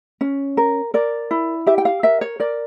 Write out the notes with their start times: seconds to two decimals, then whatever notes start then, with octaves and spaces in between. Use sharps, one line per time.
0.21 C#4
0.57 A#4
0.94 A#4 D5
1.31 E4
1.67 G4 E5
1.78 G5
1.85 F5
2.03 A#4 E5
2.21 C#5
2.40 A#4 D5